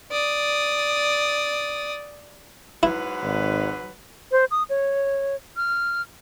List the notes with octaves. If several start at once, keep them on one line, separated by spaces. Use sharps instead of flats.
D5 D#6
G#2 F#3 E4 B4
G#1
C5
D#6
C#5
F6